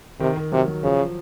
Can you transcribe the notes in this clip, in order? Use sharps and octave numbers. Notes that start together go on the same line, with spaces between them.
C3 D#3
D#3
C3 F#3
F#3
C#3 F3